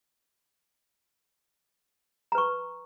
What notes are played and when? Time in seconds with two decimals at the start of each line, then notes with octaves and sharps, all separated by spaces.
2.32 A#5
2.35 B4
2.38 C#6